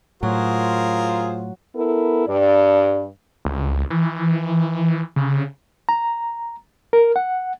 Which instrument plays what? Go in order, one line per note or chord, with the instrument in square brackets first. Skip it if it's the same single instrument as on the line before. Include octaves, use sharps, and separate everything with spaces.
[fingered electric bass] A2 [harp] F#3 [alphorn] F4 [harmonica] G#4 A#4 C5
[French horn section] B3 E4 A4 A#4
G2 D5
[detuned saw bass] C#2
E3
C#3
[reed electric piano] A#5
A#4
F#5